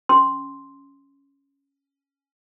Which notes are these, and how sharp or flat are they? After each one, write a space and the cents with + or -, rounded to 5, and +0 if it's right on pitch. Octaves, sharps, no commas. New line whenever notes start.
C#4 +0 C6 +0